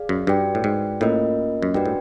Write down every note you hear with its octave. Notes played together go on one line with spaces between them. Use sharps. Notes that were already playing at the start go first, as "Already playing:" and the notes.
Already playing: G#4 D5 F5
F#2
G2 F#4 B4 D5 G5
A2
G#2
A2 A#3 C#4 F4 A#4 D#5
F#2
G2 D4 F#4 B4 D5 G5
A2